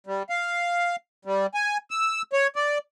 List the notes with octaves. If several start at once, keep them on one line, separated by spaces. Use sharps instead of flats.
G3
F5
G3
G#5
E6
C#5
D5